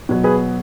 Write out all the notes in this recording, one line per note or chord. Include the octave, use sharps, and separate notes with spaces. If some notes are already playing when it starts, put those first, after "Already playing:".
B2 F#3
G#4 B4